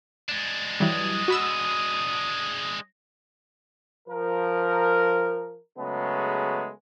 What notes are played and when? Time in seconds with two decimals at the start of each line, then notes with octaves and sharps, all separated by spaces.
0.29 G#3 D4
0.80 E3 F#3 G3 D#6
1.28 F#4 B5 E6
4.08 F3 A#4
5.78 C#3 F#3 G#3 A3 B3